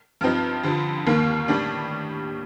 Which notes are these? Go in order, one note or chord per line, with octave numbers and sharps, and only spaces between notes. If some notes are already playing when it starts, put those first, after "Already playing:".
G2 F3 C4 D#4
F2 D3 F3
D#2 D#3 A#3
A2 G3 D4